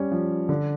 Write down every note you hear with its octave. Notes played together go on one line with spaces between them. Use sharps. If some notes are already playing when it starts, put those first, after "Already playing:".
Already playing: G3 C#4
F3
D3